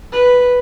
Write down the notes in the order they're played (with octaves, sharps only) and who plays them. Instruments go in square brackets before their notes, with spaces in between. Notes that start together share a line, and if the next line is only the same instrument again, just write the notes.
[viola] B4